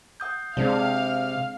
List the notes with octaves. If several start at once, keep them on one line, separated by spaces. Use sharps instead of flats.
F#5 D#6 G6
C3 G#3 C4 D4 F5